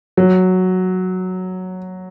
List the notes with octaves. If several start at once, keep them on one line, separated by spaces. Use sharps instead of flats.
F#3